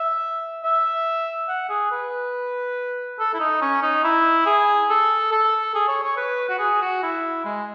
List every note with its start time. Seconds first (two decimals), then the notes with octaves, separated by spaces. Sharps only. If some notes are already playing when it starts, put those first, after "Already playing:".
Already playing: E5
0.64 E5
1.48 F#5
1.69 G#4
1.91 B4
3.19 A4
3.34 E4
3.40 D#4
3.61 C#4
3.82 D#4
4.04 E4
4.46 G#4
4.89 A4
5.32 A4
5.75 G#4
5.88 C#5
6.03 C#5
6.17 B4
6.49 F#4
6.59 G#4
6.81 F#4
7.03 E4
7.45 G#3